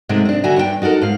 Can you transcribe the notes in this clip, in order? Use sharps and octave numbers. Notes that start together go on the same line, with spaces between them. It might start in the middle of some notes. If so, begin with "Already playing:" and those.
G#2 C3 G#3 A3
C4 D4
D3 F#4 E5 G#5 A#5
G2 D4 G#4 G5
D#4 F#4 A4 A#4
G#2 F5